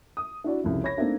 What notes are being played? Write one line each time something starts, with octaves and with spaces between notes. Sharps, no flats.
D#6
D4 E4 F#4 D5
C2 F2 C#3
C#5 B5 G#6 A#6
A3 A#3 C4 D4 D#4